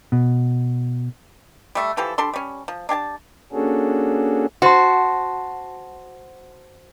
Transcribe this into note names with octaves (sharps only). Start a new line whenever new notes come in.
B2
G3 A3 E5
E3 F3 G4 A4
G3 D4 A4 C6
G3 C#4
F3
D4 G4 G#5 A5
A#3 C#4 D4 F#4 G#4 A4
F#4 C5 A5 C6